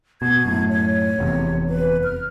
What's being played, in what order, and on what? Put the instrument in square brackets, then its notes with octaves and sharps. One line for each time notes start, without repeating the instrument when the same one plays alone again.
[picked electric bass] B2 [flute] G#6
[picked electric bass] F#2 A2
[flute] C#5
[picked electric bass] F1 E2 C3
[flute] B4
F6